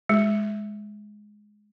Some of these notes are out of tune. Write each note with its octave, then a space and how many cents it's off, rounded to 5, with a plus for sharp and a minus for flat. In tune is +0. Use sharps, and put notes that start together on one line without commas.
G#3 +5